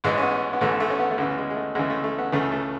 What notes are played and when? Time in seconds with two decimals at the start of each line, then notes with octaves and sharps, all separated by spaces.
0.04 A1 G#2 E3 G#3
0.18 C#4
0.23 B3
0.53 B3
0.61 A1 G#2 E3 A3
0.80 A3
0.90 C#4
0.99 B3
1.11 A3
1.18 D2 C#3 E3 B3
1.38 G#3
1.50 G#3
1.56 A3
1.75 D2 C#3 E3 G#3
1.90 A3
2.04 A3
2.18 B3
2.32 C#2 C#3 E3 A3
2.52 A3